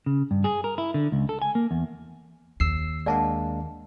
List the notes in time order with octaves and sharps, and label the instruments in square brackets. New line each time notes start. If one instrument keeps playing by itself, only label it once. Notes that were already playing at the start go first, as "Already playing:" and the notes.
[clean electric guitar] C#3
G2
G#4
A#4
E4
D3
C#2
A4
G#5
A#3
E2
[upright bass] D#2 [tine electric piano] E6 C7
[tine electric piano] G#3 A#3 D4 [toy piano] D5 F#5 A5